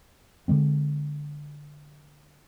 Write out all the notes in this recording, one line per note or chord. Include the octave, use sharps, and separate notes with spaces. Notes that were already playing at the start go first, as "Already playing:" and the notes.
D3 F#3 G#3 C4